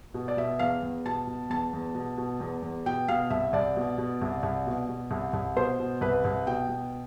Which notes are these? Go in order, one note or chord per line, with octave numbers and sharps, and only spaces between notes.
B2
D5
B2 E5
E2 F5
E2
B2 A5
B2
E2 A5
E2
B2
B2
E2
E2
B2 G5
B2 F5
C2 E5
C2 D5
B2
B2
C2
C2
B2
B2
C2
C2
B2 C5
B2
C2 B4
C2
B2 G5
B2